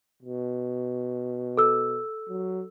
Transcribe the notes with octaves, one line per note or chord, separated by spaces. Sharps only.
B2
A4 E6
F#3